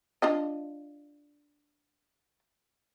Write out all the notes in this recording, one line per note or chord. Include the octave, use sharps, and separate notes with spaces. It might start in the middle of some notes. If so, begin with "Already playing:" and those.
D4 F4 D#5